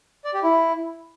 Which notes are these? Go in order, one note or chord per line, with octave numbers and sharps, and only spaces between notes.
D5
G4
E4